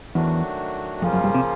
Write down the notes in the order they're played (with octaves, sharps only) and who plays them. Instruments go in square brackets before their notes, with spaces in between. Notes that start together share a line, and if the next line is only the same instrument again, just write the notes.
[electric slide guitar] E2 [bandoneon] D#3 F#3 A3 D4 F#4
[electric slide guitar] F2 [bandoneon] C#3 F3 A#3 C#4 F4
[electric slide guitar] F#2
G2
C3